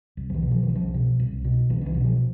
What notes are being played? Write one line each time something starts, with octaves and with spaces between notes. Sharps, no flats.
C2
F3
E3
B2
F3
E3
C2
F3
B2
C2
B2
C2 E3
D3
E3
B2
F3